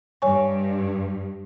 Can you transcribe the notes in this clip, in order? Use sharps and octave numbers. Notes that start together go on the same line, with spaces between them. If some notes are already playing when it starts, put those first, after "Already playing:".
G2 C#5 G#5 C#6